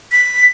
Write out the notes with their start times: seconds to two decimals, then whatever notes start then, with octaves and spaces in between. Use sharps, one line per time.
0.12 B6